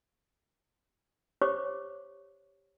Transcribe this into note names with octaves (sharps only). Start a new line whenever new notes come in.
G4 C5 C#5 C#6 D6